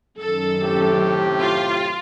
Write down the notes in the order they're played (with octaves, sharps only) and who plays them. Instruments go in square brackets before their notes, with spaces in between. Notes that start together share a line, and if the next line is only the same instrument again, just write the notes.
[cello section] F#2 D#3 [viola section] A4
[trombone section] A2 C3 G4
[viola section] F4